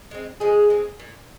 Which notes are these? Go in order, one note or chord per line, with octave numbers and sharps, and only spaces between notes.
G#3 C4
F3 G#3 G#4
G#3 C4
A#2